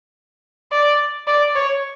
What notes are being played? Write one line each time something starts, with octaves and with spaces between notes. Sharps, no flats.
D5
D5
C#5